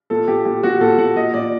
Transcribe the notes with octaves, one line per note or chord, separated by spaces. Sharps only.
A#2 A4
A#2 G4
A#2 G4
A#2 F#4
A#2 A4
A#2 F#5
A#2 D#5
A#2 D5